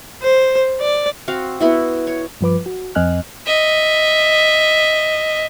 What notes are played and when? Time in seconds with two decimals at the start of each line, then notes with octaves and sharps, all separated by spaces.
0.22 C5
0.80 D5
1.28 C4 F#4 F5
1.60 B3 E4 F#4
2.07 C#5
2.41 G2 F3 B4 D6
2.66 F#4
2.95 F2 C4 D#5 G#5 F6 F#6
3.46 D#5 E5